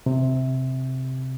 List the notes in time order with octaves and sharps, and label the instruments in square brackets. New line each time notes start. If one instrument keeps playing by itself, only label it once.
[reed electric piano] C3